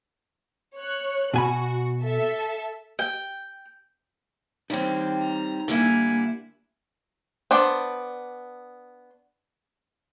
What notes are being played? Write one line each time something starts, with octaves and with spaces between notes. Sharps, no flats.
C#5 F#6
B2 F#4 G#5 B5
A4 E5
G5
G3 C4 D#4 C#5 G5
A#5
D3 G3 A#3 E4 G#5
B3 D4 C5 D5